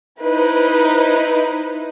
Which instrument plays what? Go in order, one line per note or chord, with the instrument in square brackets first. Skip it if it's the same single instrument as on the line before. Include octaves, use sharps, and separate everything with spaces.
[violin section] D#4 E4 B4 C5